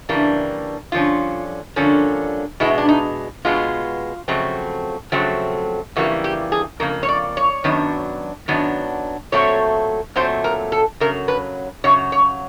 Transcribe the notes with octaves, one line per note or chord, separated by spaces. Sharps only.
C#3 E3 G3 A#3 D4
G2 D3 F3 C#4 F4
G2 D3 F3 A#3 C#4
B2 G#3 B3 E4
D4
D#4
B2 G#3 B3 F4
F2 C#3 F#3 A3 C4
F2 C#3 F#3 A3 C4
F2 C#3 E3 G3 A#3 F#4
G4
G#4
F2 C#3 A#3 A#4
C#5
D5
C#5
F#2 D#3 F#3 B3 D4
F#2 D#3 F#3 B3 D4
A#2 F#3 A3 C4 C#5
A#2 F#3 A3 C4 C5
A#4
A4
F#2 C#3 F#3 A#4
B4
F#2 C#3 F#3 C#5
C#5